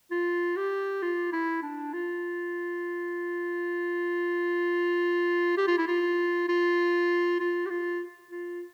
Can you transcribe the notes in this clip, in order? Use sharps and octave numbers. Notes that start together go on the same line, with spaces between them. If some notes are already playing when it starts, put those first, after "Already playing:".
F4
G4
F4
E4
D4
F4
G4
F4
E4
F4
F4
F4
G4
F4
F4